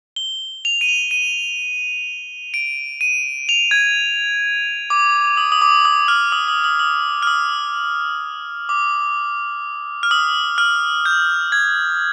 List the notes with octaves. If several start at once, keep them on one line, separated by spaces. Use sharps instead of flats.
G7
F7
D#7
F7
D#7
D7
D#7
F7
G#6
D6
D#6
D#6
D6
D#6
F6
D#6
D#6
D#6
D#6
F6
D#6
D6
F6
D#6
F6
G6
G#6